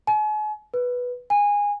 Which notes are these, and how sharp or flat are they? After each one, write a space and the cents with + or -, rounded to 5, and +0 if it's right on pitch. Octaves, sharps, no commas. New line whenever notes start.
G#5 +40
B4 -5
G#5 -20